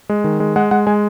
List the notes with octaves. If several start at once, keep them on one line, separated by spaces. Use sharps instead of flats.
G#3
D#3
G#3
G#3 F#5
G#3 F#5
G#3 G#5